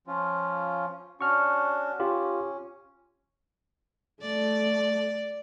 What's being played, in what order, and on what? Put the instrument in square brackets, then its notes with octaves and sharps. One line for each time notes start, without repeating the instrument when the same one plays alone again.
[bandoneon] F3 C#4 F4
[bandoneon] C#4 D4 F#4 [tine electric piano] C#6 F6
[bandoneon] C#4 [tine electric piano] F4 G4
[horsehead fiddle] A3 [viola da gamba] D5